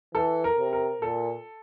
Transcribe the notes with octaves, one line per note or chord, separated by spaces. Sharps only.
E3 A4
A#4
C3
A#4
A#2 A4